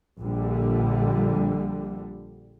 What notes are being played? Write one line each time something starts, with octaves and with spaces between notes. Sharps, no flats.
A#1 D3 G3